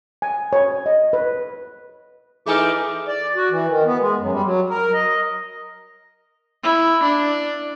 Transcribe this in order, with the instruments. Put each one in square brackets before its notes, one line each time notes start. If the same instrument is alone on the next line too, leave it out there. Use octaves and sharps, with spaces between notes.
[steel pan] G#5
C#5
D#5
B4
[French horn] E3 [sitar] A3 D#4 A4 [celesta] G#4 G#5 F6 [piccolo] D6
[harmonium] D5
F#4
E3
D#3
B3
G#3
F#2
G3
F#3
A#4
D#5
[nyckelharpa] E4
D4